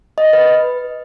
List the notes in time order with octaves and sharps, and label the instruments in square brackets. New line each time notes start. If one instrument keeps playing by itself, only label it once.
[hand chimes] D#5
B4